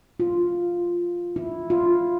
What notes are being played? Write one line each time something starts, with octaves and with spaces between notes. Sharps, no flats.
F4
E4
F4